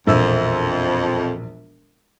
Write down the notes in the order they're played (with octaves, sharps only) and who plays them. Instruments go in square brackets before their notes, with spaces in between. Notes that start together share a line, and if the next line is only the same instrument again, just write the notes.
[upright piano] E1 A#1 E6 [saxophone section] F2